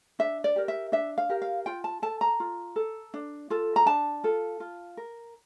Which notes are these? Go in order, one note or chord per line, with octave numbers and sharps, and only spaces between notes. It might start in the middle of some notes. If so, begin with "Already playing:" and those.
D4 E5
D5
G4 A#4
E5
D4 E5
F5
G4 A#4
F5
F4 G5
A5
A4 A5
A#5
F4
A4
D4
F4 A4
A#5
D4 A5
F4 A4
F4
A#4